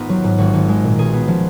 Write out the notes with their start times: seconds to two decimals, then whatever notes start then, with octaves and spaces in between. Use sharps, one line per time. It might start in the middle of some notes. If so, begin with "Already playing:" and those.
Already playing: G#1 B3 D#4 F4
0.09 F#3
0.24 G#2
0.38 G#1 F#4
0.53 G#1
0.69 G#3
0.84 A#2
0.98 B1 G#4
1.13 B3
1.28 F3